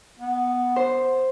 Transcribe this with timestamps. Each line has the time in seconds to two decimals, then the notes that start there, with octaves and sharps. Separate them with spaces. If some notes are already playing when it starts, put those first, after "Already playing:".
0.19 B3
0.76 C5